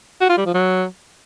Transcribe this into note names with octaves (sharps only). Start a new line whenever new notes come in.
F#4
F4
G3
F3
F#3